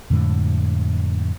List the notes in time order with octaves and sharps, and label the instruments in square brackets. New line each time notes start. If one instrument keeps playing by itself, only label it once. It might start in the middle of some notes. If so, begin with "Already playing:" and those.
[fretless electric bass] F2 A2 D3 G#3